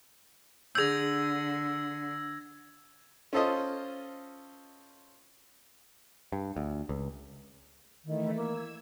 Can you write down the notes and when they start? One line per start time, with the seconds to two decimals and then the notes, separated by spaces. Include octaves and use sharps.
0.75 D3 G#4 E6 G6 G#6 A#6
3.33 C#4 F4 A4 C5 D#5
6.32 G2
6.56 D2
6.89 C#2
8.05 D#3 E3 A3 E4
8.35 A#3 E6 G#6